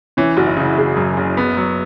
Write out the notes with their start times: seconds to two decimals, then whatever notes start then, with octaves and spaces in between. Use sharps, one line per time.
0.17 E3 C#4
0.37 F#1 F#4
0.47 E4
0.57 C#3
0.77 F#1 G#4
0.96 F#2
1.17 F#1
1.37 B3
1.57 F#3